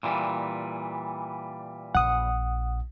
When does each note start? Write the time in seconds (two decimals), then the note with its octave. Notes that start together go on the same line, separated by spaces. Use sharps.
0.03 A#2 E3 G3
1.95 A#1 F#5 D#6